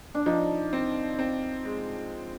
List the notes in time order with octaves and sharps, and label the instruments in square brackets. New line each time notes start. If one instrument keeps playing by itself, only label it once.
[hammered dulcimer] D4
[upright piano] F3 [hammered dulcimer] D#4
[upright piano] C4
C4
G#3